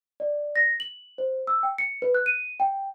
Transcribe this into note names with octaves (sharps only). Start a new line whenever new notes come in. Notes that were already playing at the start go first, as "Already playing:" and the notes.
D5
A#6
F#7
C5
E6
G5
C#7
B4
F#6
D#7
G5